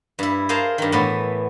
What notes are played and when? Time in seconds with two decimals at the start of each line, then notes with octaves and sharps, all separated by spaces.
0.19 G2 E4
0.49 G#4 A#4 C5 F5 A5
0.78 G2 D#3
0.92 A2 E3 B3